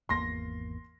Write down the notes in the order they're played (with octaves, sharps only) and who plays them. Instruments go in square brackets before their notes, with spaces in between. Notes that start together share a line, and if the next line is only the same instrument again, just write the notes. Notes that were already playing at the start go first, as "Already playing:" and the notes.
[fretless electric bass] G#1 E2 A#3 [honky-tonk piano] C6 A#6